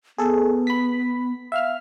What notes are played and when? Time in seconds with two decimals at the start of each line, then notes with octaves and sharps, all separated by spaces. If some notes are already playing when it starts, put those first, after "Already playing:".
0.18 B3 G#4 A4
0.67 B5 B6
1.52 E5 F5 F6